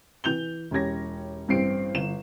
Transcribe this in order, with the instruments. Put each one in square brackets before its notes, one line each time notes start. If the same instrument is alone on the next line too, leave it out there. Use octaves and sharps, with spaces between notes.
[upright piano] E3 G6 F7 G7
E1 C#4 G4 G#6 A#6
A1 G2 C4 C7 D7
G1 E7